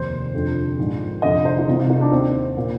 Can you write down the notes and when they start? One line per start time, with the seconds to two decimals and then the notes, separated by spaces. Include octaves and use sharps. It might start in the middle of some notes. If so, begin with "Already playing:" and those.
Already playing: F1 D#2 D#3 C5
0.34 F1 F2 D3
0.78 A#1 G#2 D#3
1.22 F1 F2 D3 D#5
1.45 C5
1.58 D#4
1.68 C2 C3 D#3 F4
1.79 F4
1.90 D#4
2.01 D4
2.12 D#2 D#3 C4
2.57 A#2